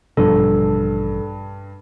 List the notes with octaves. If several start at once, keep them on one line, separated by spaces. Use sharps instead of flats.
A1 G2 B2 F3 G3 A4